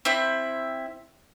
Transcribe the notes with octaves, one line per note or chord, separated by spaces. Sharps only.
C4 E4 E5